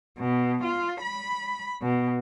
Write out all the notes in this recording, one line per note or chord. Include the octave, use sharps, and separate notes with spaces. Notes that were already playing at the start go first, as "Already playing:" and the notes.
B2
F4
B5
B2